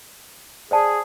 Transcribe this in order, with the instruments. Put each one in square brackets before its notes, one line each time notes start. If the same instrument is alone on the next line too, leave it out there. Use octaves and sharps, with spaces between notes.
[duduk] G#4 [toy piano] C5 D5 A5